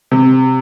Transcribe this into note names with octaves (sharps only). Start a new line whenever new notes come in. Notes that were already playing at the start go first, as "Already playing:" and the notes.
C3